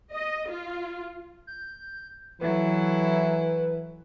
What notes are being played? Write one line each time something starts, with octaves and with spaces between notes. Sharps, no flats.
D#5
F4
G6
E3 F#3 E4 A4 B4